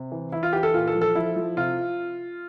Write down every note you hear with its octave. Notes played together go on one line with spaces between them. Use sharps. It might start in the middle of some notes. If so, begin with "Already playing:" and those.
Already playing: C3
E3
E3 E4
F4
E3 G4
A4
A#2 F4
A4
F3
A4
F3 E4
F3
C3 F4